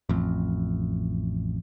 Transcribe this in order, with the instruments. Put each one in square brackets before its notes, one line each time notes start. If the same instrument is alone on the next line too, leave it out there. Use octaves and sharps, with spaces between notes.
[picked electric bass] A1 F2